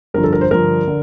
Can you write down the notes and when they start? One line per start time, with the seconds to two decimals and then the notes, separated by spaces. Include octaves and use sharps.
0.14 G2 D3 F3 A#4
0.24 A4
0.33 A#4
0.41 C5
0.51 G2 D3 F3 A#4
0.88 D3